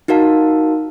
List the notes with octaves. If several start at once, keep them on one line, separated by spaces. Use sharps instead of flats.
D#4 F#4 A#4 F5 A5